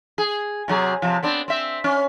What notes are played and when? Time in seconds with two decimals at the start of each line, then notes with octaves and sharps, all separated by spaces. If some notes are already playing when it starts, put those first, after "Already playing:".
0.18 G#4
0.68 C3 F#3 G#4
1.02 C3 F3
1.23 B3 C4 D4
1.48 C4 E5
1.84 C#4